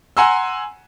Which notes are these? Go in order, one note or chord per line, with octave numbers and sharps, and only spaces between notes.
F#5 G#5 A#5 C6 E6